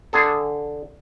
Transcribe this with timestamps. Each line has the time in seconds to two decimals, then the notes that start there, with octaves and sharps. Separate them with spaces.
0.13 D3 G#4 A4